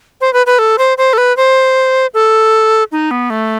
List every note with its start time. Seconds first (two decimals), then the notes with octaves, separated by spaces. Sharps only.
0.21 C5
0.33 B4
0.46 B4
0.59 A4
0.78 C5
0.98 C5
1.13 A4
1.18 B4
1.37 C5
2.14 A4
2.92 D#4
3.11 B3
3.30 A3